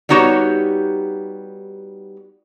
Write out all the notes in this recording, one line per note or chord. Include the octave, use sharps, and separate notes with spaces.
G3 B3 D#4 F#4 G4 C#5